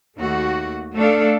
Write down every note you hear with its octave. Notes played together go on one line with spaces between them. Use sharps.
D#2 A3 F#4
A3 D4 A4 F5